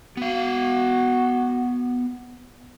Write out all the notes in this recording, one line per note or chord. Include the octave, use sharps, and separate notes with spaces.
B3 F#4 F5